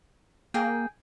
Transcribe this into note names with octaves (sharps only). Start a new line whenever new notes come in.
A#3 G#4 G5